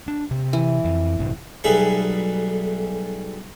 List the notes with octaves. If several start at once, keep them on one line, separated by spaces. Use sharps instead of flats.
D4
C3
E3
F2
A#1 G2 C3
B1 G3 A3 G#4 B4 G#5